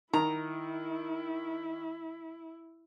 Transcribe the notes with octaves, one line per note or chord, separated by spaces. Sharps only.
D#3 E4 A#5